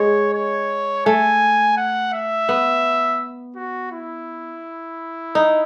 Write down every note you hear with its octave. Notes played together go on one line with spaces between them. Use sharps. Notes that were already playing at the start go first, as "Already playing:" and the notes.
Already playing: G#3 C#5
C#5
A3 G#5
F#5
E5
B3
F#4
E4
D#4